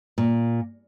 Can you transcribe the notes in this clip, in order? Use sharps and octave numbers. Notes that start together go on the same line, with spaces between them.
A#2